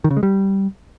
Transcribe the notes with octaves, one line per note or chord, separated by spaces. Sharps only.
D#3
C#3
G#3
G3